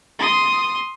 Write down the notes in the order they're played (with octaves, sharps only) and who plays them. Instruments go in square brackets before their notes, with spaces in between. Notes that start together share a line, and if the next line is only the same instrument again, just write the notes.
[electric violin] C6 D#6